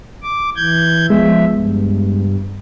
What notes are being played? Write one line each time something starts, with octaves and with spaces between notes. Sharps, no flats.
D6
E3 G6 G#6
C2 F3 G#3 B3 E5
G2